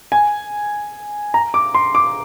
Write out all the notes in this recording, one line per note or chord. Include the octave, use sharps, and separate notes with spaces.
G#5
A#5
D6
C6
D6